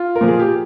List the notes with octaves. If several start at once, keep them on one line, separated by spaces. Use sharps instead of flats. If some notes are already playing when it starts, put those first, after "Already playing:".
Already playing: F4
A#4
A#2 F3
G#4
G4